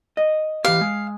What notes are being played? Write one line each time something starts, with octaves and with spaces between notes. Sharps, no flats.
D#5
E3 G4 F5
G#3